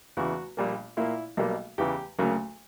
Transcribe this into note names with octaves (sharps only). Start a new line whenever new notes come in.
E2 C#3 E3 F#4
A#1 A#2 G3 A#3
A#2 A#3 E4
B1 B2 G3 A#3
E2 C#3 E3 G4
D2 C#3 F#3 A#3